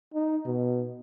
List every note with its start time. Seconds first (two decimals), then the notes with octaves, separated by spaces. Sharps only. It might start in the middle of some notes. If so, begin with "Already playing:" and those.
0.14 D#4
0.45 B2